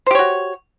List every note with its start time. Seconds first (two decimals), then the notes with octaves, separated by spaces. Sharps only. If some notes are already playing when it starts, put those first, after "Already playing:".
0.06 C5
0.11 G4
0.15 C#5
0.19 F#4